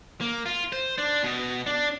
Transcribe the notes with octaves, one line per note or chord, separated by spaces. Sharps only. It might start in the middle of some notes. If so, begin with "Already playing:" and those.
A#3
F4
C5
D4
B2
D4